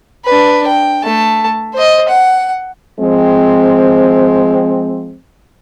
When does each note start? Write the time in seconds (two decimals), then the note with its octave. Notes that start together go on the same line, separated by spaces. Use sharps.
0.25 D4 B4
0.67 G5
1.04 A3 A5
1.74 C5 D#5
2.08 F#5
2.99 F3 G#3 C4